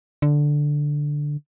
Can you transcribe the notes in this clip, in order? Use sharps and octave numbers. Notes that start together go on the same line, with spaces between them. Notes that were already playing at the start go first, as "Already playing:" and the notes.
D3